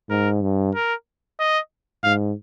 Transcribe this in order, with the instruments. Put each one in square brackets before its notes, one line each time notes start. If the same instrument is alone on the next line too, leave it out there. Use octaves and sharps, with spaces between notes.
[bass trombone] G#2 [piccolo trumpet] A#4
[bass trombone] G2
[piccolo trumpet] A#4
D#5
[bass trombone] G#2 [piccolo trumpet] F5